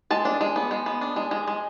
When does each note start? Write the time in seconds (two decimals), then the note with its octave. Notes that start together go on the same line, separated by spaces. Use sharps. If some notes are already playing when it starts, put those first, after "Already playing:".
0.10 G#3 A5
0.25 D4
0.41 G#3
0.56 B3
0.71 G#3
0.86 B3
1.01 D4
1.16 G#3
1.31 G#3
1.47 G#3